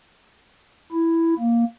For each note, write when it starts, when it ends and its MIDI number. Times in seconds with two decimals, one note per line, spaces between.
0.92 1.34 64
1.39 1.64 58